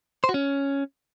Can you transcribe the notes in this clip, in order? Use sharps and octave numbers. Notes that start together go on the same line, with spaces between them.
C5
F#4
C#4